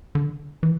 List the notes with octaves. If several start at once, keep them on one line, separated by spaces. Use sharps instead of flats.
D3
E3